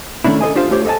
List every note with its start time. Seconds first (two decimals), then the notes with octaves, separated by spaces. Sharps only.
0.24 D#3 A3 C#4 D4 E4
0.41 A4 C5 D#5 G#5
0.55 D4 F4 G4 C5 F5
0.71 A3 F4 G4 C5 C#5
0.85 A4 D#5 F5 G#5 A5